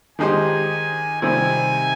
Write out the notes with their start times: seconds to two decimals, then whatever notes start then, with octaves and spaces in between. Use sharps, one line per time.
0.18 D#3 G#3 D#4 G4 C5 G#5
1.22 C3 D#3 G3 C4 G#5